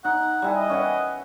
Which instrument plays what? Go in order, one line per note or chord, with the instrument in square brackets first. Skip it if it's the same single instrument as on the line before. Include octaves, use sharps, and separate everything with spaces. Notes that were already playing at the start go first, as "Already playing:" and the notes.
[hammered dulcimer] D#4 [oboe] F#5
[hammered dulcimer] G3 E4 G#5
[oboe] D#5
[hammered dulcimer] C#4 B4 F#5